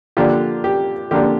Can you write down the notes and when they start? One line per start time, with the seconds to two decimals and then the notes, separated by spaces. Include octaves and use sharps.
0.17 D3 F3 A#3 D4 F4 G4
0.64 G4
1.11 D3 F3 A#3 D4 F4 G4